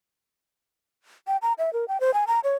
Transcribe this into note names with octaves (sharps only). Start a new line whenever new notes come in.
G5
A#5
E5
A#4
G5
C5
G#5
A#5
C#5